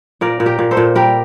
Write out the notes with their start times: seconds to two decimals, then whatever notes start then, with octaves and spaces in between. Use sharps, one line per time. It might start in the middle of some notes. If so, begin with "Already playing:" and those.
0.21 A#2 A#4 D5
0.40 A#2
0.46 G4 A#4
0.59 A#2
0.71 A4 C5
0.77 A#2
0.95 G3 G4 A#4